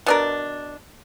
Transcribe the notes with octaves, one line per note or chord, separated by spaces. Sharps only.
B2 D4 A#4